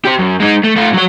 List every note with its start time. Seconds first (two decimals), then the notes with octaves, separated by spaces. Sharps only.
0.05 G4 C5
0.19 F#2
0.40 G#3 D#4
0.64 A3
0.76 A3 F4
0.94 F#3 C#5